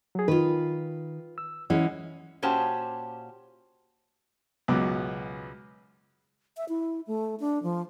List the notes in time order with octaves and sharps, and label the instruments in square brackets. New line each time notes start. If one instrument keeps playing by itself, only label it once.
[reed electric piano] F#3 G#4
[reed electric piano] D#3 [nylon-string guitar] F4 B4
[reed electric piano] E6
[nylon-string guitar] E3 G#3 C#4 [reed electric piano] E4 F#5
[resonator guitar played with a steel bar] A#2 C#4 F#4 G4 C5 A5
[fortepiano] C#2 F#2 B2 B3 D6
[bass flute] E5
E4
A3
D4
F3